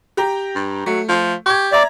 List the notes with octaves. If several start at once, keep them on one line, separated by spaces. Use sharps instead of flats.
G4 G5 A#5
G2
F#3 A3
F3
G4 C#6 G#6
D5 E5 A#5